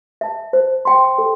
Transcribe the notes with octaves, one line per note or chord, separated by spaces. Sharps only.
E5 A5
C5
G5 C6
A4